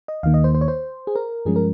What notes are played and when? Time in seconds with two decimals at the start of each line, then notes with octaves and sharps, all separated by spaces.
0.08 D#5
0.23 D#2 D#3 A#3 F5
0.34 D#5
0.44 C5
0.54 C5
0.61 C#5
0.68 C5
1.07 G#4
1.16 A#4
1.45 G2 F3 G#3 C#4 G#4
1.56 A#4